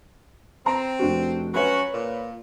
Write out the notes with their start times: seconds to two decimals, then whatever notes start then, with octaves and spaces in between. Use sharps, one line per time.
0.66 C4 A#5
0.99 F1 D4 F#4
1.54 F#3 C#4 F#4 B4 C#5
1.93 A#2